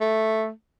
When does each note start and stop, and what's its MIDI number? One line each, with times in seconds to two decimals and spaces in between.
0.01 0.50 57